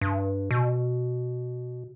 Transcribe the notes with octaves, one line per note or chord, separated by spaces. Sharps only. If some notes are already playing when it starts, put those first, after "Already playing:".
G2
B2